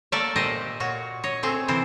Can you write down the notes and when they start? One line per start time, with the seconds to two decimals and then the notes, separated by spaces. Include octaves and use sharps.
0.12 A3 A#3 A4 D5 E5
0.36 A#2 G4 C5 D#5
0.80 A#2 F#4 C#5
1.24 C#5 D#5
1.43 A3 C4 G#4
1.68 C3 E3 C5